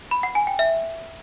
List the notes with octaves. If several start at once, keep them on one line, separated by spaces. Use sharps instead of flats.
B5
F#5
G#5
G5
E5